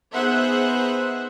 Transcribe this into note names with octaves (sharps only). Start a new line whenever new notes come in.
B3 D#4 G#4 C5 E5 F#5